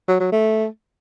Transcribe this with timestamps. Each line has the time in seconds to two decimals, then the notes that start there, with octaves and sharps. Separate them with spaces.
0.08 F#3
0.20 F#3
0.32 A3